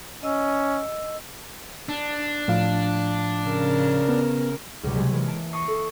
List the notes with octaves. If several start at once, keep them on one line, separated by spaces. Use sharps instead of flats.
C#4 D#5 E6
D4
A2 F3 F5
C#3 A#4
B3
C#2 B2 G3
C3 F#3 G#3
E3 G#3 A#3
A5 D7
A5 C#6 D#6 A#6 C7 C#7
A4